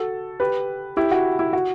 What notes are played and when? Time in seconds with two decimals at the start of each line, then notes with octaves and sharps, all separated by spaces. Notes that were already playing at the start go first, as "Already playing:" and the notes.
Already playing: F#4 A4
0.40 G4 B4
0.97 E4 G4
1.11 F#4
1.39 E4
1.53 F#4